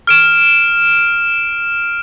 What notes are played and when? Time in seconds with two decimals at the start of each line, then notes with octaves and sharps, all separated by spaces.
0.07 F6 D7 E7